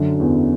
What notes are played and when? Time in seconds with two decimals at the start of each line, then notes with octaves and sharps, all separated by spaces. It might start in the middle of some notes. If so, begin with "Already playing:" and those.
Already playing: F#2 D3
0.20 E2